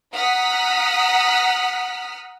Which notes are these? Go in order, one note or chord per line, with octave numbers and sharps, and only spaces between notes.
F#5 A#5 D#6 F6 B6